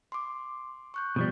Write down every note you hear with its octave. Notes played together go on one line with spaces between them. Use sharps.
C6 D6
C#6 F#6 G6
B2 F3 G3